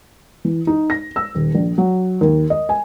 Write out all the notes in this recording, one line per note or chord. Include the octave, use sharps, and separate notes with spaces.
E3
D#4
A#6
E6
D#1
A#1
F#3
D#2
D#5
G#5